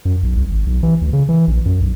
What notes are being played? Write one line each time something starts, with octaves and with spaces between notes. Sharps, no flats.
F#2
B1
C2
G#1
B1
E3
D2
C#3
E3
A#1
F#2
B1